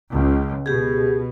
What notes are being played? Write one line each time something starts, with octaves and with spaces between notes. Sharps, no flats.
C#2
B2 G4 G#4